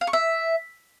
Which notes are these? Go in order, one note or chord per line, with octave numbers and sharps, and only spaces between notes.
F5
C#6
E5